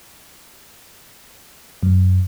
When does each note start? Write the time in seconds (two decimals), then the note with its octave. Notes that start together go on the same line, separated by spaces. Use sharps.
1.83 F#2